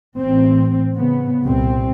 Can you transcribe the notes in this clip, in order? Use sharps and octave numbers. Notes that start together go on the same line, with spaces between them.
A1 C4
C#3 B3
C2 A#2 C4